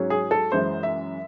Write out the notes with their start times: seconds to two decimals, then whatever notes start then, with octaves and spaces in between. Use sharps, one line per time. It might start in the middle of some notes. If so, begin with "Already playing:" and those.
Already playing: G#2 F#3 C#4
0.10 G#4
0.31 A4
0.52 F#2 E3 G#3 C5
0.83 E5